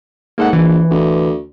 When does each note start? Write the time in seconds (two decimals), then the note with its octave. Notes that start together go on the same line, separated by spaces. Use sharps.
0.38 G#2 A#3 A4 F#5
0.53 A#1 E3
0.91 D2